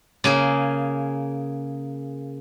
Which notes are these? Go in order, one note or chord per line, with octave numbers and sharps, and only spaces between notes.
C#3 A#3 G#4